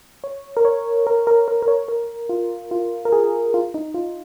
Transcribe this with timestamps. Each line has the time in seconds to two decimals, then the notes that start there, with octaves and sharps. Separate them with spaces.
0.24 C#5
0.57 A#4
0.65 C#5
1.07 A#4
1.27 A#4
1.48 A#4
1.62 A#4
1.68 C#5
1.88 A#4
2.29 F4
2.71 F4
3.05 A#4
3.12 G#4
3.54 F4
3.74 D#4
3.94 F4